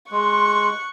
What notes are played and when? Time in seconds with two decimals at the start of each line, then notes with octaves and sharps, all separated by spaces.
0.12 G#3 C6 C#6 F#6